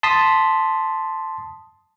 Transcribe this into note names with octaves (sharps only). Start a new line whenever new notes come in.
A5 C6 D#6 B6